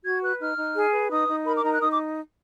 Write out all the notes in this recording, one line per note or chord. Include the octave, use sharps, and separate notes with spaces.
F#4 G#6
B4 F#6
D#4 F6
D#4
G#4
B4
D#4 D#6
D#4
A#4 B5
D6
D#4 A#5
F#6
D#4 D#6
D6